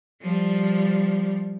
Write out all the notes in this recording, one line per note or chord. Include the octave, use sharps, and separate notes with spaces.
F3 G3